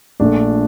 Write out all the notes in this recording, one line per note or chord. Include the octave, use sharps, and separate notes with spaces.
A#1 A#2 A3 D4